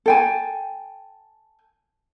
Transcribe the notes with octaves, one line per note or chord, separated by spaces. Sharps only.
A4 G5 G#5